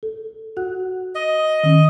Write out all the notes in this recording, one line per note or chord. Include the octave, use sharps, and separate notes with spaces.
A4
F#4 F#5 F#6
D#5
D#3 C#4